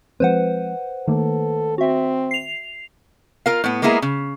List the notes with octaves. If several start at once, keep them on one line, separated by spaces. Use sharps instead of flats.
F3 G#3 C4 B4 C5 F#5
D#3 A3 A#3 A4
C4 F#4 E5
C7 F7
F4 A#4 F5
A2 B3
G#3 A#3 B3 E4 G#4 A#4
C#3